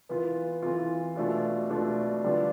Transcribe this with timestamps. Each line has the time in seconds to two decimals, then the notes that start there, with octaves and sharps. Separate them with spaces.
0.09 E3 B3 F4
0.63 E3 B3 F4
1.16 B2 A3 D4 F4
1.70 B2 A3 D4 F4
2.24 D3 G3 B3 D4 F4